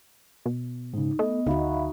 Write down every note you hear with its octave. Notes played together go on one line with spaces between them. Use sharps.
B2
G#2 C#3 D#4
A3 B3 D#5
D2 D#4 F#4 E5 F5 B5